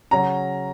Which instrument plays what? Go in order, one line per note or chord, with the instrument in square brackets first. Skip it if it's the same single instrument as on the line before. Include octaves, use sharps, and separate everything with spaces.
[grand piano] C#3 F#3 C#4 A#5